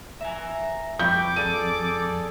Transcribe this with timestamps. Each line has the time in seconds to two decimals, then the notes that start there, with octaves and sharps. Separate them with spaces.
0.21 E5 G#5 A#5
0.99 F2 G5 B5 C#6 D6 G6
1.36 G#4 A4 D5 D#7